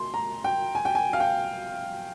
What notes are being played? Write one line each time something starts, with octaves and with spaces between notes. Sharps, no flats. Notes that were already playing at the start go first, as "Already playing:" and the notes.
Already playing: C6
A#5
G5
G#5
G5
G#5
F5
G5